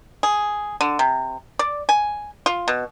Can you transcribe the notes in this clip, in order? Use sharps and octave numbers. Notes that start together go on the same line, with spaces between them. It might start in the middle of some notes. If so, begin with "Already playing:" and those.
G#4
D3
C3
D5
G#5
F4
B2